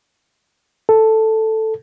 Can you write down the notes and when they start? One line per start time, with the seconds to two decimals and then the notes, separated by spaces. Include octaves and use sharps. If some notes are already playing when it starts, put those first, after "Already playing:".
0.89 A4